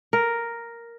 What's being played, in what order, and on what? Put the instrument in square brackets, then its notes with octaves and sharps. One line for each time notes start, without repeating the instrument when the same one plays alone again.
[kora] A#4